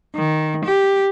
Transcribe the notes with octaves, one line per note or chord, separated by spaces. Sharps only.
D#3
G4